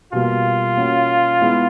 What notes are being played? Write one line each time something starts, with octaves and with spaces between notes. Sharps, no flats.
B2 G3 A#3 F4
A#3 C#4 F#4
G#3 B3 E4